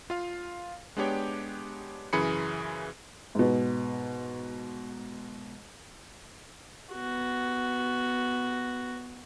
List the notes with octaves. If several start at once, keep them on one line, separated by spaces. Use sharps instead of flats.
F4 F5
G#3 B3 D4 G4 C#5 G5
F#2 C#3 E3 G#4 B5 C#7
G#2 B2
B3 F#4